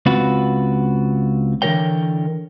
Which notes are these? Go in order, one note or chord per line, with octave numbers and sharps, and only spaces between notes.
C#2 C4 F4 F#4 B4
D3 E3 G4 A#4 C#5 G5